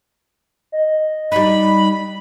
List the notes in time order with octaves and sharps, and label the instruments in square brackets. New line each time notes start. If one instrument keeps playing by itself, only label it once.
[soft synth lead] D#5
[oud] G3 D#4 [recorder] B5